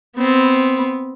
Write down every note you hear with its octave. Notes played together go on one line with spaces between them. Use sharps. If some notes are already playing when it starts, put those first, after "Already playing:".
B3 C4